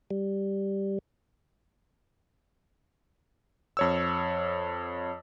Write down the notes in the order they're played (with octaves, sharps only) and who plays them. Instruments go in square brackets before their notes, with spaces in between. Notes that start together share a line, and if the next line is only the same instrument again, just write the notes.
[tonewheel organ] G3
[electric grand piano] F2 C#5 E6